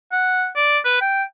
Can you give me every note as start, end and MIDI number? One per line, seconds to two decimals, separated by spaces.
0.12 0.48 78
0.56 0.78 74
0.85 1.01 71
1.01 1.23 79